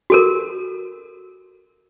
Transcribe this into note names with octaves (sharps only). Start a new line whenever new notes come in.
F#4 A4 A#4